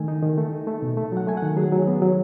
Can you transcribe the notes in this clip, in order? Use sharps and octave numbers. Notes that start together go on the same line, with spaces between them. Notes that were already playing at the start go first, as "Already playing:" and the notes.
Already playing: D#3 A3 G#5
D#4
D#3
A3
D#4
A3
B2
A3
F#3 F#5
A3 G#5
F#5
D#3
F#3 G#4
F#3
B3
F#3